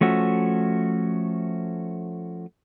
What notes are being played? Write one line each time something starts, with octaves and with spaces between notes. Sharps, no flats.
F3 A3 C#4 F#4 E5